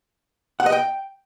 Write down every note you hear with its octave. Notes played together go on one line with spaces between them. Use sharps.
F#5
D#5
G5